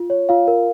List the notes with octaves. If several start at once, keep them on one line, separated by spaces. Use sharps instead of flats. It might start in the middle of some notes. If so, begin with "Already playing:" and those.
Already playing: F4
C#5
F4 F5
A#4